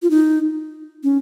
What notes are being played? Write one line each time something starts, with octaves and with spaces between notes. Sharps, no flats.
F4
D#4
C#4